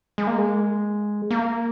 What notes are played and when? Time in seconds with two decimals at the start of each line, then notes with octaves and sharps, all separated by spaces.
0.18 G#3
0.27 A#3
0.38 G#3
1.31 A#3